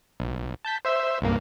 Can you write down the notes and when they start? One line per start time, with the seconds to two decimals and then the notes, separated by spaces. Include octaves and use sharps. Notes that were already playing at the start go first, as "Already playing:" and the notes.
0.20 B1
0.65 A5 G6 B6
0.85 C5 E5 E6
1.21 C2 G2 A#3